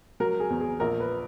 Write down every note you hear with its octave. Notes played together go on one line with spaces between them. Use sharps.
F#3 A#4
G#4
E2
G#4
A#1 A#4
B4